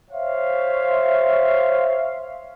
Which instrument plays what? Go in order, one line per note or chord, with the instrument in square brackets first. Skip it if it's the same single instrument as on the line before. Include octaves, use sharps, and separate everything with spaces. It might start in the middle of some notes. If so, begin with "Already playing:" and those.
[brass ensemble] C5 C#5 E5 F5